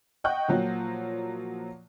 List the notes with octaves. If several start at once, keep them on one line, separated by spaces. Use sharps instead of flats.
D#5 F#5 G5 C#6 F#6 G6
A#2 F3 F#3